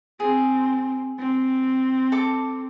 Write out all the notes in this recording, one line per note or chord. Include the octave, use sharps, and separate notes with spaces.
C4 G#4
C4
A4 A5 D6